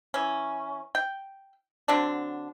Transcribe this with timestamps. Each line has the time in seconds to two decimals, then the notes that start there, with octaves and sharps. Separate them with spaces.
0.14 E3 C#4
0.95 G5
1.88 D3 F#3 C4 D4